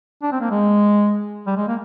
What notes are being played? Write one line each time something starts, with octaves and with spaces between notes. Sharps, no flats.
D4
C4
A#3
G#3
G3
G#3
A#3